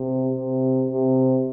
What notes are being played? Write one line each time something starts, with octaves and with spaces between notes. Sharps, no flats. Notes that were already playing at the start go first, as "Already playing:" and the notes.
Already playing: C3
C3
C3